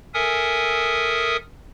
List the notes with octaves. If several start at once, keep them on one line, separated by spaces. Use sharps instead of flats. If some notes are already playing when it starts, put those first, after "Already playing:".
A4 A#4 E5 G#5 D#6